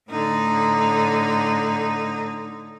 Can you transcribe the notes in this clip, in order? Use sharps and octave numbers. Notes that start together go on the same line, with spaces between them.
A2 D3 D#4